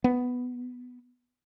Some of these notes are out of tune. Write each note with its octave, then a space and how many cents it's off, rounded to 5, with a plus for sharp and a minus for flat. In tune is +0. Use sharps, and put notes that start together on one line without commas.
B3 +5